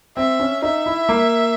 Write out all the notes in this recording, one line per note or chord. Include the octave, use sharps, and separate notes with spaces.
C4 E5
C#4
D#4 E5
E4
A#3